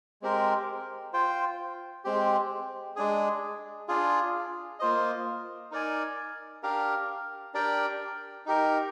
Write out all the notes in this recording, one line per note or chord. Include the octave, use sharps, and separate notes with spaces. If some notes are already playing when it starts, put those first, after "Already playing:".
G#3 C4 G4 A#4
F4 C5 G5
G#3 C4 G4
G#3 D4 G#4
D4 F4 G#4
A#3 F4 C5 D#5
D#4 A#4 D5 G#5
D4 G4 A#4 F5
D4 G4 A#4 D5 G5
D#4 G4 A#4